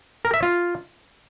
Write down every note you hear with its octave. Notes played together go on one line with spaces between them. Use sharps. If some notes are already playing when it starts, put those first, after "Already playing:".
A#4
E5
F4